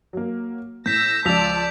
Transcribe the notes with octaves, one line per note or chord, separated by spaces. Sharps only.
F#3 A#3
A2 E6 G6 A#6 B6
C#2 F3 D5 A5 E6 B6 F7